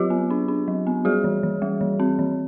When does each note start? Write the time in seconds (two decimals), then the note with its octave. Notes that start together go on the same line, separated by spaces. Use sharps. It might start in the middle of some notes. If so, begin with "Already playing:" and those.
Already playing: F#3 F4 G4
0.10 B3
0.30 D4
0.48 D4
0.68 F#3
0.87 B3
1.05 G3 F#4 G#4
1.24 E3
1.43 E3
1.62 G3
1.81 E3
2.00 C4
2.19 E3